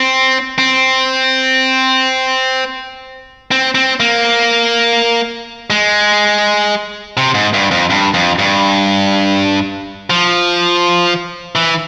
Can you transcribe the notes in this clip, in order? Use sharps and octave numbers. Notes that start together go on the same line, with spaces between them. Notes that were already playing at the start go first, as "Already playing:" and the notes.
Already playing: C4
C4
C4
C4
A#3
G#3
C3
G#2
G2
F2
G2
F2
G2
F3
E3